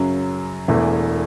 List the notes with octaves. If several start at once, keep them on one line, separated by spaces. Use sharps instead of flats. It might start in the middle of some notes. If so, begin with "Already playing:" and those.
Already playing: F#2 C#3 F#3
E1 E2 E3 A3 E4